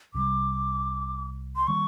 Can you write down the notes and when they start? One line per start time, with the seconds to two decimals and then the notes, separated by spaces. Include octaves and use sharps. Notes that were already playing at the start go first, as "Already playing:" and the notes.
0.14 C2 C3 E3 G3 D6
1.56 C6
1.67 D#3 G3 A#3 C#6